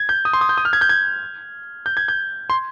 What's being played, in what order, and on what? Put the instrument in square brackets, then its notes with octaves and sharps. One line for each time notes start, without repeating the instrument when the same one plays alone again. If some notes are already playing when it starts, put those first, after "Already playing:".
Already playing: [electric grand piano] G#6
G6
D#6
C6
D#6
G6
D#6
F6
G#6
G6
G#6
G6
G#6
G6
C6